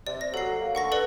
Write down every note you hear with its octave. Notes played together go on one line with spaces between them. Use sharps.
C3 D5
A#6
F#3 A4 C7
A#3
D3 F#5 C#6 A#6
A4 B4 D5